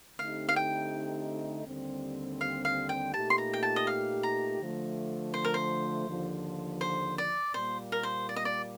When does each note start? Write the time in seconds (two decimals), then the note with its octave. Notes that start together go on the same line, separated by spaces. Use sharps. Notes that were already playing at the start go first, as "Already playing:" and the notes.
0.19 D3 A3 C4 D#4 G4 F5
0.49 F5
0.56 G5
1.67 D#2 D3 G3 C4
2.41 F5
2.65 F5
2.89 G5
3.13 A#2 A3 D#4 G4 A5
3.30 C6
3.38 A#5
3.53 G5
3.63 A5
3.76 D#5
3.87 F5
4.23 A#5
4.60 D3 F3 A3
5.34 C5
5.44 A#4
5.54 C5
6.08 D#2 D3 F3
6.81 C5
7.18 D5
7.54 A#2 G3 A#3 C5
7.92 A#4
8.03 C5
8.29 D5
8.36 D#5
8.45 D5